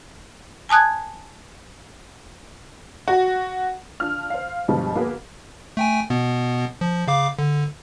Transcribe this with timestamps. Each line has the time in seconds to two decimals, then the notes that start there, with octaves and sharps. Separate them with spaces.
0.69 G#5 A5 D#6 F#6 G#6
3.08 F#4
4.00 D4 F4 F6
4.30 C5 F5
4.68 G2 B2 F3 G3 G#3
4.96 A#3 B3 F#4 G#4 B4
5.77 A3 G5 G#5
6.10 B2 B3
6.81 F3
7.07 C#3 F5 D6
7.39 D3